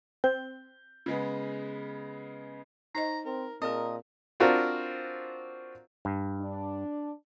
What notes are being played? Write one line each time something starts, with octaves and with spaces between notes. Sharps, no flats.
C4 G6
C#3 G#3 B3
D#4 C5 D#5 A#5
C4 A#4
A#2 C4 G#4 A#4 D#5
C4 D4 F4 F#4 A#4
G2
D4